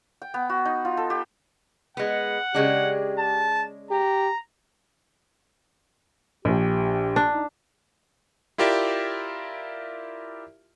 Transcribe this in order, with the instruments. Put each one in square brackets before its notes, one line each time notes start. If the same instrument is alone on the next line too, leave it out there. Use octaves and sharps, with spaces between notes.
[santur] G5
B3
F#4
D#4
F4
A4
G4
[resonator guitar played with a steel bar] G#3 B3 [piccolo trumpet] F#5
[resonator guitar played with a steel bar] C#3 G#3 D4 [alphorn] G4
[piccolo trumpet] A5
[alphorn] G4 [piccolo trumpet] A#5
[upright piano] A#1 [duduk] G4
[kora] D4
[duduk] D#4
[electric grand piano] E4 F4 G4 A#4 D5 E5